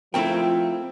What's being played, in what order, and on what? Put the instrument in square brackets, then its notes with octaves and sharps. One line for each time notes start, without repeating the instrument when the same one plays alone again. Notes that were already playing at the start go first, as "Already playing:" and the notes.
[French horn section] F3 [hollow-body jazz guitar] A3 C4 A#4 [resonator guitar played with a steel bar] E4 G5